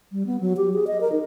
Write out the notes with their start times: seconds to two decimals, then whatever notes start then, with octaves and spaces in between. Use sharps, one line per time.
0.12 G3
0.27 B3
0.41 F#3
0.57 G4
0.74 G#4
0.87 D#5
1.01 A#4
1.12 D#4